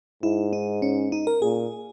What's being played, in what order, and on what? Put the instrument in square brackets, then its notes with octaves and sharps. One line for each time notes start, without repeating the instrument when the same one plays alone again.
[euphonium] G#2 [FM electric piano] E4
[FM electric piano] D#4
C#4
D#4
A#4
[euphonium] A#2 [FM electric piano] G#4